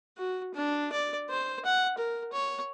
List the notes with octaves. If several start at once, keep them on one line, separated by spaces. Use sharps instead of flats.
F#4
D4
D5
C5
F#5
A#4
C#5